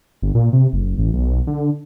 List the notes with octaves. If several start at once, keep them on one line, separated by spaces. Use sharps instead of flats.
G1
A#2
C3
F#1
A1
B1
D3